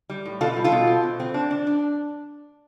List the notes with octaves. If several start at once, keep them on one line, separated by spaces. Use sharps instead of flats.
G3
A2
B2 F4 A4
G3
F4 A4
B2
C4
B2
C4
D4
D4
D4